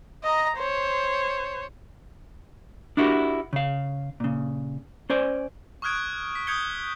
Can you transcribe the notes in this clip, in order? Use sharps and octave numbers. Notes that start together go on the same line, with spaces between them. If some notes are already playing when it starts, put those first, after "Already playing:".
D#5 A#5
C5 C#5
D4 E4 F#4 G4 A4 A#4
C#3 F5
A#2 C#3
C#4 C5 D5 G#5
C#6 D#6 F6 F#6 G#6 D7
B6
D#6 G6 G#6 C#7 G7